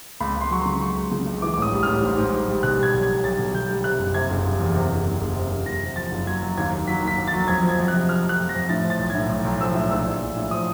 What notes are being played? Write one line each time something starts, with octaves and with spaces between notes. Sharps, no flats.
C#2 B5
C#2 C6
F#3 C#6
C#3 C6
F#3 C#6
C#2
C#3
C#2
E3 D6
D6
A1
D#6
G3
A1 F6
G#2
G#2
G3
G3
B2 F#6
G3 G#6
B1
G#6
B1
B1 A6
B2
B2 G6
G3
C3 F#6
F#1
C3 G#6
F#1
F#1
E2
C3
F#1
F#1
F#1
C3
F#1
F#1 A#6
C3
F3 A6
F#1
F#3 G#6
F#3
D#2 G#6
D#2
F#3 B6
D#2
B6
D#2
A6
F#3
F2 G#6
F3
G#6
F2
F#6
C3
F3 F6
F2
F#6
F2
A#6
F2
A2 A6
F3
A6
B1
A2 G#6
B1
B1
F3 E6
A2
A#1 E6
A#1
A#1
A2
F3 D#6